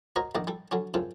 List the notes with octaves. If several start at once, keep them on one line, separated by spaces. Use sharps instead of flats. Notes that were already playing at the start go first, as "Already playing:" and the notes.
F#4 A#4 C5 C#5 D#5 A#5
A#1 D#3 D5 D#5 F#5
G3 A4
D3 F#3 C#4
F#2 C#3 C4 F4 A4